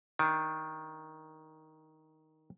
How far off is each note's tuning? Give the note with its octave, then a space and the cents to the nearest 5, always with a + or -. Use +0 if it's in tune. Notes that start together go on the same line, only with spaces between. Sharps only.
D#3 +10 D4 +0